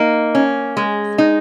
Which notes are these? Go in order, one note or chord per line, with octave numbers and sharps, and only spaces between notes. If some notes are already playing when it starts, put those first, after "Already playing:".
Already playing: A#3 D#4
C#4
G#3
D#4